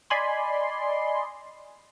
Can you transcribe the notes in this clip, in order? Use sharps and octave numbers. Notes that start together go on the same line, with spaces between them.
D5 D#5 G#5 B5 C6